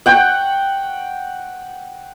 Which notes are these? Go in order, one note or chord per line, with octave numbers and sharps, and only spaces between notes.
F#5 G5 C#6